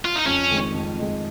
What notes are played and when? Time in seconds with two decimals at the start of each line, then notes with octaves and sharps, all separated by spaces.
0.05 F4
0.16 D#4
0.26 F2 C#4
0.51 D#3 G#3
0.75 F2
0.99 D#3 G#3